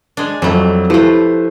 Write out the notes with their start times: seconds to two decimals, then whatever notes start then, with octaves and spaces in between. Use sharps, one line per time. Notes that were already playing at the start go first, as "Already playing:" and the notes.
0.17 G#3 D4
0.42 F2 F#3 G3 A3
0.90 F3 A3 E4 G4 B4 C5